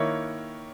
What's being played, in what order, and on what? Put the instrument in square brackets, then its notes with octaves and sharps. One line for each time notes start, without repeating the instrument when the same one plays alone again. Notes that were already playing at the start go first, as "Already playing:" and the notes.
Already playing: [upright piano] D#3 A#3 E4 C#5